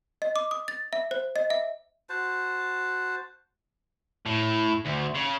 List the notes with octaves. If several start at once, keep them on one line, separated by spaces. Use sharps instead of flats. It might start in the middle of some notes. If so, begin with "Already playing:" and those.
D#5
D6
D#6
A6
E5
C5
D#5
E5
F#4 C5 A5
A2
D2
C#3